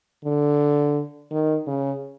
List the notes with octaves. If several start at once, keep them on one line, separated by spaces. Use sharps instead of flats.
D3
D#3
C#3